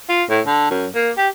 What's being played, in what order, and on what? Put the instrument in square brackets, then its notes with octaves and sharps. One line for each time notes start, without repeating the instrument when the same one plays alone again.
[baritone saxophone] F4
A2
D3
F#2
A#3
G4